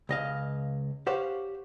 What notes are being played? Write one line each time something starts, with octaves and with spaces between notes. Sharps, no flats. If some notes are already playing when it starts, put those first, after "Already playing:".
C#2 D#5 F5
G4 C5 C#5 F5 F#5